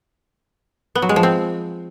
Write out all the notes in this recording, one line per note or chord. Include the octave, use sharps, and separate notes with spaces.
B3
F#3
G#3
F3
C4